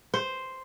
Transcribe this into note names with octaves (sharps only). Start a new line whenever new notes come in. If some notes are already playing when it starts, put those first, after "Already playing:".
C5